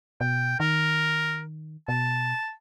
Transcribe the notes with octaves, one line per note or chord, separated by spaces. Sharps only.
B2 G5
D#3 A#4
B2 A5